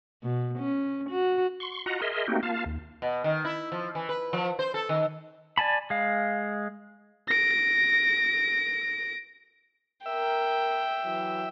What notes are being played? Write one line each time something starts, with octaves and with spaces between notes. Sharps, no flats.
B2
C#4
F#4
C6 C#6
F4 F#4 D#5 F#5 A#5
G#4 A#4 D#5 E5 C6
A3 A#3 C4 D#4 F#4 G4
A#3 F4 F5 A5
D#2
B2
D#3
E4
F3
E3
B4
F3
C5
A4
D#3
D5 G#5 A5 B5
G#3 F5
A#6 D7
A#4 E5 G5
E3 F#3